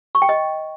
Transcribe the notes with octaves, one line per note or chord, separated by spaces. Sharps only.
C#6
G5
D#5